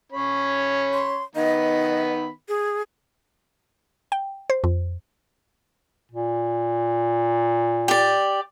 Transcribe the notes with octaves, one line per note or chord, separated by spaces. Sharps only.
C#4 C#5 B5
C6
D#3 B3 D#5 B5
G#4
G5
C5
F2
A#2
G4 D5